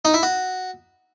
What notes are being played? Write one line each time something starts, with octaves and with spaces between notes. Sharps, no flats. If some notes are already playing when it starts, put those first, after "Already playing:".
D#4
E4
F#4